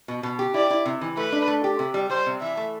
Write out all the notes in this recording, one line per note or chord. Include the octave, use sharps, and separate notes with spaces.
B2
B2
G4
E4 D5
E4
C3
E3
A3 B4
D4
A3
G4
C3
G3
G3 C5
C3
E3 E5
A3